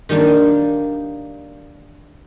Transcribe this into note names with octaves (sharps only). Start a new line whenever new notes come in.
D#3 G3 A#3 D4